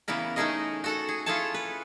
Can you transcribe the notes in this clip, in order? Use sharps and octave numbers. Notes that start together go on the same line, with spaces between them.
C#3 E3 B3 E4 A#4
A3 C#4 D#4 G#4 A#4 D#5
F#4 A4 F#5
G#4
E4 F4 G#4 A4 C#5 A5
B4